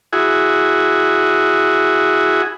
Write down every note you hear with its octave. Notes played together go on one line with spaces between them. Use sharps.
E4 F#4 G#4